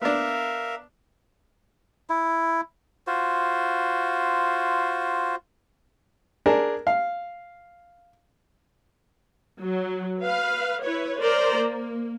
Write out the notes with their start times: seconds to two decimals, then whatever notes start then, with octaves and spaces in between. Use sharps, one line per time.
0.02 B3 D4 A#4 E5 F5
2.10 E4
3.07 F4 F#4 C5
6.46 D4 G#4 A#4
6.87 F5
9.60 F#3
10.21 B4 F5
10.83 E4 B4 C#5
11.20 A#4 C5 D5 A#5
11.55 A#3